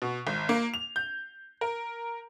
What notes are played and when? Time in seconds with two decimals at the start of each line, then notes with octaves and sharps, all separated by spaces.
0.02 B2
0.27 G#1
0.49 A#3
0.74 F7
0.96 G6
1.61 A#4